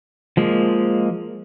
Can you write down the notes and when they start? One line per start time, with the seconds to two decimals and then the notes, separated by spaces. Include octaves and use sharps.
0.37 F3 G#3 A#3